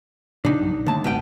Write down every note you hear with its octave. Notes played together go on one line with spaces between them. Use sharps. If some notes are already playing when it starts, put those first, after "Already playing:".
A#2 C#3 F3 D4 D#4
B1 G2 F#3
B1
D#2 D3 A3 A5
D1 A1 B2 G#3 B3 G5